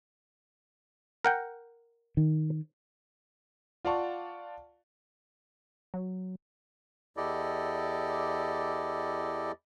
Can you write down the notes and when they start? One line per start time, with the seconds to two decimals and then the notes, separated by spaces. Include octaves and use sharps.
1.25 A#4 F#5 G5
2.17 D#3
3.85 F4 D5 F5 F#5 A5 C#6
5.94 F#3
7.17 E2 E4 G4 A4 D5 D#5